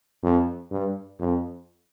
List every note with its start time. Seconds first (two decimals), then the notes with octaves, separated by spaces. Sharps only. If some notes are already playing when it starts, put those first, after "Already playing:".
0.23 F2
0.71 G2
1.20 F2